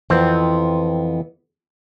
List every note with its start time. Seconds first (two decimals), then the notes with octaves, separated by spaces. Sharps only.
0.10 F2 E3 B3 C4